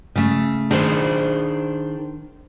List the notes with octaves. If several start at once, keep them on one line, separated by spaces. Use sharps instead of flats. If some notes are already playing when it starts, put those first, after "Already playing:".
C#3 A3
D#3 D4 G#4 C5